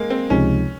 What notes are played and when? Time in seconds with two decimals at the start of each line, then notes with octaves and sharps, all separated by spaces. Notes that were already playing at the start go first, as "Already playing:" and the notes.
Already playing: G#3 A#3
0.10 C4
0.30 C#2 C3 F3 G#3 C#4 D#4